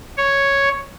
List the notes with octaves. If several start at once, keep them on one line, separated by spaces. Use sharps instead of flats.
C#5